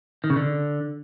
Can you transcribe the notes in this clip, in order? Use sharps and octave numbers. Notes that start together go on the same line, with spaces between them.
D#3
C#3
D3